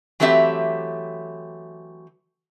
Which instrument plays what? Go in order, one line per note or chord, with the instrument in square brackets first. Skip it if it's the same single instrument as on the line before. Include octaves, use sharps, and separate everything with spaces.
[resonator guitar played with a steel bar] E3 F#3 A3 C4 G4 E5